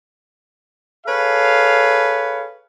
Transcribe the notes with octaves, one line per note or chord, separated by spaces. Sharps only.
G#4 A4 B4 C#5 F5